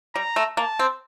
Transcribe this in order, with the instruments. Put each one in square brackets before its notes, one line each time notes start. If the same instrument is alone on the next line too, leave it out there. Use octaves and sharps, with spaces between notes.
[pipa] G3 [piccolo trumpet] A#5
[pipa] A3
[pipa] A#3 [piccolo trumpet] A5
[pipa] C4